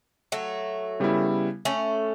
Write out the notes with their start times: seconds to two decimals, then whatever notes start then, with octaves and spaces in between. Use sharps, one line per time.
0.32 F#3 A3
1.00 C#3 G3 B3 E4
1.65 A3 C#4